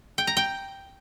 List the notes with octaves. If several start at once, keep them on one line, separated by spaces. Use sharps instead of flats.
G5
A#5
G5